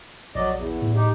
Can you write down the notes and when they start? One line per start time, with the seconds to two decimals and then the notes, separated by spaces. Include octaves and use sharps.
0.35 A#1 F#3 D5 D#5
0.56 E2
0.82 A2
0.96 D#4 G4